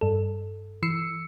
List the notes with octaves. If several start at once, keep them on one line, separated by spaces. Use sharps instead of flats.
G2 A4
E3 E6 C7 C#7